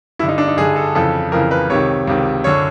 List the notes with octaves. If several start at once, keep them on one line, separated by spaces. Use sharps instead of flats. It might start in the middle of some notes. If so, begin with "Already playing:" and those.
G2 D3 E4
D#4
D4
D#4
G2 D3 G#4
A4
F2 C#3 E3 A4
F2 C#3 E3 A#4
B4
C#2 C3 D#3 C#5
C#2 C3 D#3
F#2 D3 C#5